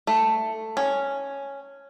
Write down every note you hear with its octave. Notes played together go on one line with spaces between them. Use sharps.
A3
C#4